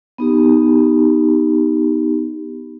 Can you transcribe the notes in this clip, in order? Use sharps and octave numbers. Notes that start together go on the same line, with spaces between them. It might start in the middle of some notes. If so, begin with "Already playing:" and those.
B3 D#4 G4